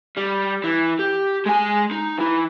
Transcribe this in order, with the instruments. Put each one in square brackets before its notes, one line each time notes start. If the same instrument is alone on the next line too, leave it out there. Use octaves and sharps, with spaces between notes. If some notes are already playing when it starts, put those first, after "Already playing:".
[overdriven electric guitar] G3
E3
G4
G#3 G#5
D#4
E3 E4